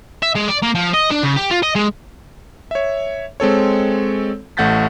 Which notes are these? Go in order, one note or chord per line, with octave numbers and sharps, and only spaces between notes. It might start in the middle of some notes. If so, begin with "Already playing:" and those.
E5
G#3
D5
A#3
F3
D#5
D4
C#3
G4
F4
D#5
G#3
C#5 E5
G#3 C4 A4 C#5
A1 A3 F#5 G6 A6 B6